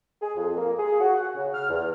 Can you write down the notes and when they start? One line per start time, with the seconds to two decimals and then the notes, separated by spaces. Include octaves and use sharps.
0.22 G#4
0.37 F2
0.56 A#3
0.79 G#4
1.00 F#4
1.17 F#5
1.36 C#3
1.54 F6
1.70 E2